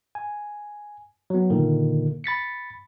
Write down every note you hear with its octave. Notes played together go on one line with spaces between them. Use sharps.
G#5
F#3 B3
A#2 D3 D#3 A#3
B5 A6 B6 C#7